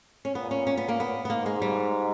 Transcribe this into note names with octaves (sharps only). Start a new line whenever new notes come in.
C#4
A#2 B3
C#4
C#4
B3
A#3
B3
B3
G#2 A#3
G#3
G3